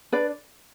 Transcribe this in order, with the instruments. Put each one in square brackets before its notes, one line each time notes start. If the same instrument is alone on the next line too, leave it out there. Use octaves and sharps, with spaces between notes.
[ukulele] D4 B4 D5